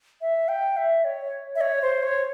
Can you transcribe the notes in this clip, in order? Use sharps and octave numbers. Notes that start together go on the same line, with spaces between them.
E5
G5
E5
C#5
E5
C#5
C5
C#5